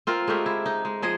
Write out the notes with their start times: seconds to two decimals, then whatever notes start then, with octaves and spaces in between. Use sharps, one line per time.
0.07 C4 F4 A#4
0.28 G#3 A3 G4 A#4
0.46 E4
0.66 D#4
0.85 G#3
1.02 F3 G#4 D#5